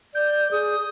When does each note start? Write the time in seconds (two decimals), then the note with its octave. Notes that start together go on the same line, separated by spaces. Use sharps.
0.14 D5 G6
0.51 G#4 D#6